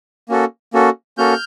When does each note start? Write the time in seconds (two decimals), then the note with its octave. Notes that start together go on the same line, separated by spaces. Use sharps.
0.29 A#3 C#4 F#4 A4
0.73 A#3 C#4 F#4 A4
1.18 A#3 C#4 F#4 A4 F6 G6